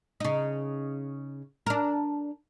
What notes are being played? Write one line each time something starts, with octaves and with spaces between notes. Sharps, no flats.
C#3 D#4
D4 A#4